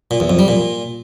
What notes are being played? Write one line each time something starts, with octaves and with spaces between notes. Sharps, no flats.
A#2
E2
F2
G3
A#2